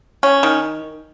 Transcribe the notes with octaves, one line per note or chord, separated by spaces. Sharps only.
C#4
D#3